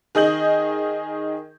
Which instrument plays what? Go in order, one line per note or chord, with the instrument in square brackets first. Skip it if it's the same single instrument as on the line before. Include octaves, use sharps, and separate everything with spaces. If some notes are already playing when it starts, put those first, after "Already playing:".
[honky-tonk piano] D#3 G#4 D#5 G6 F#7